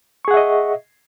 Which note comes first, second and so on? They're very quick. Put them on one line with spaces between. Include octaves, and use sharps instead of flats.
C#6 G#4 F#5 E5 D#5